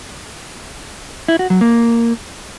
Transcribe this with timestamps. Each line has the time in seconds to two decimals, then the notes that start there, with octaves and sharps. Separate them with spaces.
1.28 E4
1.39 F#4
1.50 F#3
1.61 A#3